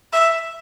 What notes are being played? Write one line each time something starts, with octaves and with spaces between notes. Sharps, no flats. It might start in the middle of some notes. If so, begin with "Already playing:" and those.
E5